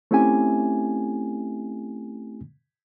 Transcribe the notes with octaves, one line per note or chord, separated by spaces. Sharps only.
A3 C4 C#4 E4 G4 G#5